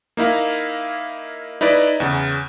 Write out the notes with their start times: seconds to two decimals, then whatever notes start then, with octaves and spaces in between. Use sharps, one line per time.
0.17 A#3 D#4 E4 F5
1.61 D#4 E4 B4 D5
2.00 E2 C#3